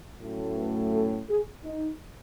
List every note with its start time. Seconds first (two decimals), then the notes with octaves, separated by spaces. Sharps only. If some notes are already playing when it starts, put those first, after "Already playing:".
0.20 A2 F#3 A3 C#4
0.57 B4
0.92 A4
1.29 G#4
1.64 D#4